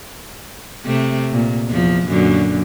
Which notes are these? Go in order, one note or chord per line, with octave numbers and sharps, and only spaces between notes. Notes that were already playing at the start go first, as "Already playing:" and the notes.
C3 A3
A#2
E2 F3
F#2 A#2 D3